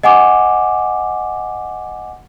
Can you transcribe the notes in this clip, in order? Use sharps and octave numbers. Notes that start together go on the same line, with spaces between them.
D#5 F#5 G#5 D6